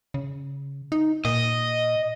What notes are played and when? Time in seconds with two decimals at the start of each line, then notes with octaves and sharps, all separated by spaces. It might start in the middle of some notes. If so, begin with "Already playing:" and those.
0.14 C#3
0.92 D#4
1.25 A#2 D#5